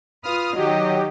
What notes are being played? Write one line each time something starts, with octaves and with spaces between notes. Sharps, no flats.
F4 B4 D#6 F6
D#3 F#3 G4 D#5